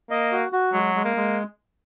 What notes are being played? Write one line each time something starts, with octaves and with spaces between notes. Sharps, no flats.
A#3 D#5
F#4
F#4
F#3 G#3
G#3
A#3
G#3